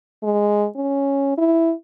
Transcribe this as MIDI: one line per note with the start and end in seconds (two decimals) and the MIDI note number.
0.23 0.67 56
0.76 1.33 61
1.38 1.73 64